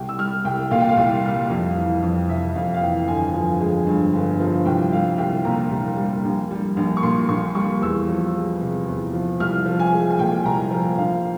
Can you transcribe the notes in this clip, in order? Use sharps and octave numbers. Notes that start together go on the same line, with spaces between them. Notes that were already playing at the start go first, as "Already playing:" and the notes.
Already playing: C2 G5
E6
G3 F6
C2 G5
A#2 F5
G5
F5
C2
G3
F2
E3
F2
C3 E5
F2 F5
F5
E3 G5
G1 G#5
F3
G#3
G2
G1
F3
C2 G5
G3 F5
C2 G5
A#2 A#5
C2
G3
A#1
G3
A#1
C#6
A#2 C6
A#1 C#6
G3 C#6
E2 E6
F3
G#3
C3
E2
F3
C2 F6
F3
G#5
G#3
G#5
A#2 G5
C2 A#5
F3
A#1 F5